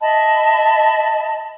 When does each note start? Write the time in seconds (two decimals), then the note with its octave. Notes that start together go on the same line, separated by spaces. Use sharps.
0.01 D#5 E5 A5 B5